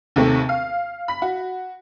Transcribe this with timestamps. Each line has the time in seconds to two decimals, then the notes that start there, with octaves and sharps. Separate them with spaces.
0.16 D#2 C3 A3 C4
0.49 F5
1.08 B5 B6
1.22 F#4